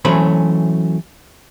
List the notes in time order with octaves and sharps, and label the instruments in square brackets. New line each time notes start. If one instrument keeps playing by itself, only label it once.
[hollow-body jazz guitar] E3 F#3 A3 C#4 C5 B5